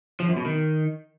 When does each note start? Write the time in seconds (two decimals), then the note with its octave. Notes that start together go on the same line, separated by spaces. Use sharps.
0.20 F3
0.28 F#2
0.36 B2
0.45 D#3